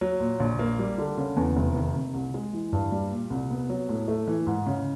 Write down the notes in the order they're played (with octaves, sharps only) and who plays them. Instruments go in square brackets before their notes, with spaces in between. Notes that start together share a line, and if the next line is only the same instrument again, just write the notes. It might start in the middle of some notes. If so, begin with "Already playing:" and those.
[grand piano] F#3
A#2
A#1
A#3
G3
D3
C#3
E2
F1
D#3
C3
C2
G#3
E3
G2
G3
A#2
C2
B3
F#3
A2
A3
E3
G#2
C#3